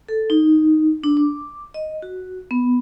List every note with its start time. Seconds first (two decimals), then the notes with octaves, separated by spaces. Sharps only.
0.09 A4
0.30 D#4
1.04 D4
1.17 D6
1.74 D#5
2.02 F#4
2.51 B3